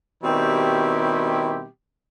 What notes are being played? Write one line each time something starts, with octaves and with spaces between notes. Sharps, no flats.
B2 D#3 G3 C4 E4 G4